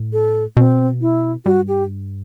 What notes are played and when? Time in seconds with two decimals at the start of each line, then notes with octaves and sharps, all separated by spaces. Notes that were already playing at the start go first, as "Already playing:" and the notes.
Already playing: A2
0.13 A4
0.57 B2 C4
1.01 E4
1.45 G2 F#4
1.68 G4